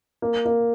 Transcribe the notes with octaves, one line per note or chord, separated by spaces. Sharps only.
A#3
A#3